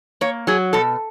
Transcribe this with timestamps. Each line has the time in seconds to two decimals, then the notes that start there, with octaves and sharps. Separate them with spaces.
0.21 A#3 C#5
0.47 F#3 G#4
0.73 B2 A4